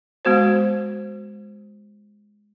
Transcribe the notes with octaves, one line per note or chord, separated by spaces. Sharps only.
G#3 B3 F#4 C5